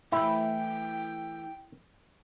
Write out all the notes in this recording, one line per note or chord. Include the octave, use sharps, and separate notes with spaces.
E3 A3 E4 G5